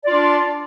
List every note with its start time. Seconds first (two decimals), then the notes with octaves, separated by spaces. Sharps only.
0.04 D5
0.08 F4
0.11 D4